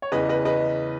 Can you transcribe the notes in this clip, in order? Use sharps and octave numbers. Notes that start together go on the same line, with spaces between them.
C#5
E2 C#3 E3 B4 D#5
B4 D#5
B4 D#5